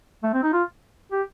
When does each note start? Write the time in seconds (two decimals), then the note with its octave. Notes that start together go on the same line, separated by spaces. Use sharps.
0.23 A3
0.34 C4
0.43 D#4
0.53 F4
1.12 G4